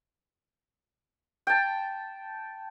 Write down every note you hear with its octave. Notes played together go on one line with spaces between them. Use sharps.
G5 A5